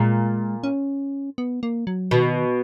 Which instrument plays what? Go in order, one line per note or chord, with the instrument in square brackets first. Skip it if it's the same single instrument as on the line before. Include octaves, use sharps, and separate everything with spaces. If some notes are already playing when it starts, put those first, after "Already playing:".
Already playing: [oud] A#2 [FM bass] G#3
[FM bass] C#4
B3
A#3
F#3
[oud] B2 [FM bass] D#3